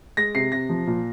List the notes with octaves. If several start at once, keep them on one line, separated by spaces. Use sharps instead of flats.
G#3 A#6
C3 C7
C3 A#6
F3
A#2